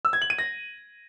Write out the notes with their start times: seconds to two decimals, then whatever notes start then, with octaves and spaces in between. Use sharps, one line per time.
0.05 E6
0.13 G#6
0.22 F#7
0.30 D#7
0.38 A#6